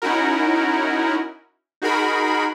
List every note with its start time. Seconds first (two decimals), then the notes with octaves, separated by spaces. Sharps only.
0.02 C#4 D#4 E4 F#4 A#4
1.82 D#4 F#4 G#4 A#4 B5